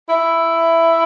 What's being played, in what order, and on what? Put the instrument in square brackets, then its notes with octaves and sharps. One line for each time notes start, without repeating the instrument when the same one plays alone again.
[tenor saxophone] E4